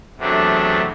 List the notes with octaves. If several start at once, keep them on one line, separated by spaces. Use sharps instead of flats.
E2 C3 F#3 A3 D4